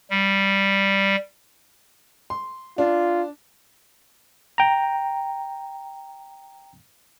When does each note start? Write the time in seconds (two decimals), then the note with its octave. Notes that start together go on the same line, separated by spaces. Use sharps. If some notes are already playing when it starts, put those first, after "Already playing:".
0.10 G3
2.30 C6
2.78 D4 F4
4.58 G5 A#5